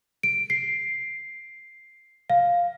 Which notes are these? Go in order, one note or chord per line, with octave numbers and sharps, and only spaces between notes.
D7
C7
F5